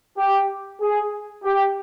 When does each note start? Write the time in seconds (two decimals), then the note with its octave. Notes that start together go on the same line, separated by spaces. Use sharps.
0.17 G4
0.81 G#4
1.44 G4